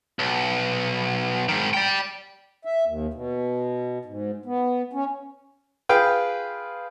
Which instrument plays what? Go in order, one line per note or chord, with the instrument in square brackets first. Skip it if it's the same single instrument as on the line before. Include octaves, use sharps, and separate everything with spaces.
[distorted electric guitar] B1
G#2 D#3
D5 G5
[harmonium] E5
D#2
B2
G#2
B3
C#4
[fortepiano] F4 G#4 B4 F5 G5